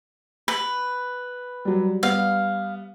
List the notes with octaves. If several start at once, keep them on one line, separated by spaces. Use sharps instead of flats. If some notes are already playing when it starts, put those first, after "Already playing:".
B4
F#3 G3
G3 B3 F5